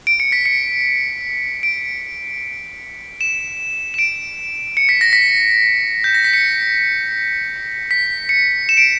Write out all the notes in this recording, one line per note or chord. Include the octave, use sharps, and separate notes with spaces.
D7
C#7
B6
C#7
D7
E7
E7
D7
C#7
B6
A#6
B6
G6
A#6
B6
C#7
B6
C#7
E7
D7